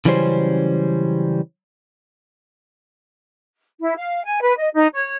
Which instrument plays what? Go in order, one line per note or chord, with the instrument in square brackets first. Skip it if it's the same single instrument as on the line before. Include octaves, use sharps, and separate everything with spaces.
[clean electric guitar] C#3 E3 F#3 G3 C#4 C5
[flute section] E4
F5
G#5
B4
D#5
D#4
C#5